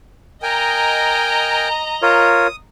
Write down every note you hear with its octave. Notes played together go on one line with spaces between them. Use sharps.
A#4 D#5 G5 G#5 A#5
F4 A#4 C#5 D#6